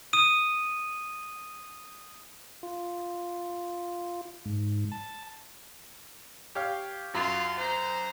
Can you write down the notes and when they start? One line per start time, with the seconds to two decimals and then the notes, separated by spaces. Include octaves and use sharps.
0.13 D#6 D#7
2.63 F4
4.46 G#2
4.92 A5
6.55 G4 C#5 F5
7.14 F#2 F#3 C#4 F4
7.58 C5 A#5